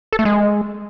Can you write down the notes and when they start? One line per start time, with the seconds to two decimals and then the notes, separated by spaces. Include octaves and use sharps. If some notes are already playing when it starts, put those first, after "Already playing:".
0.13 A4
0.19 A3
0.25 G#3